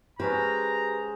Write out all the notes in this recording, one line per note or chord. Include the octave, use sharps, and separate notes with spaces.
G#3 C#4 G4 B4 C5 A#5